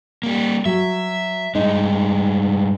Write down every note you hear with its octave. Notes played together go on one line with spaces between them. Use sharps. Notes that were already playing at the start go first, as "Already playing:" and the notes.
G3 A#3
F#3 E5
G2 G#3 D#4